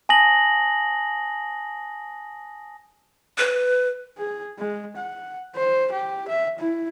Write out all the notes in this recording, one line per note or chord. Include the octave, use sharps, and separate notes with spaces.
G#5 A5 D#6 A#6 F#7
B4
G#4
G#3
F#5
C5
G4
E5
E4